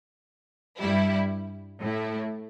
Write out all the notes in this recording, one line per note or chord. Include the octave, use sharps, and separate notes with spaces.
G2 G3 E4
A2 A3 E4